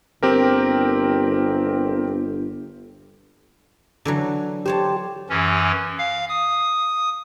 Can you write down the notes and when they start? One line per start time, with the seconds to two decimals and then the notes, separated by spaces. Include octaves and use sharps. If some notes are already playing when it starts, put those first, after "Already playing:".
0.23 G1 C4 G4 A#4
4.05 D3 E3 F#3
4.66 G4 C5 C#5 A5
5.30 F#2 E3 C#4
5.98 F5
6.29 D#6